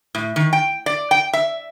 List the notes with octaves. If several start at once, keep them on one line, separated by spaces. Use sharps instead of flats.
A2
D#3
G5
D5
G5
E5